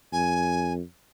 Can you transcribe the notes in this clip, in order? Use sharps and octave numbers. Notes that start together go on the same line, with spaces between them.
F2 G#5